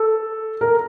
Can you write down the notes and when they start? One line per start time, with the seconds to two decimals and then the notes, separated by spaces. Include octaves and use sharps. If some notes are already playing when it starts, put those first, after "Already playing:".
Already playing: A4
0.61 A#4